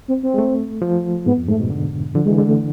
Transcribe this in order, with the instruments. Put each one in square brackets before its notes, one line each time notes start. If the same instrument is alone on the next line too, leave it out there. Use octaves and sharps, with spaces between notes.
[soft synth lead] C4
C4
[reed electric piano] G#3
A3
F3
[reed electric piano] G#2 [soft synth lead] B3
[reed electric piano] F2
[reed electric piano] G#2 [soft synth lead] A3
[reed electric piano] B2
D3
[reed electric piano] D3 [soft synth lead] F3
[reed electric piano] E3 [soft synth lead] G#3
[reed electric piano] D3 [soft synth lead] G#3
[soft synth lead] A3